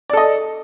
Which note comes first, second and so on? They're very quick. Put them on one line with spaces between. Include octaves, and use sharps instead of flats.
D5 A4 D#5